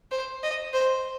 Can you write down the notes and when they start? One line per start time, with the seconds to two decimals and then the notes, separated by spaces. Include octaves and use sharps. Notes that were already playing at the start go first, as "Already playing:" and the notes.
0.11 C5
0.43 D#5
0.73 C5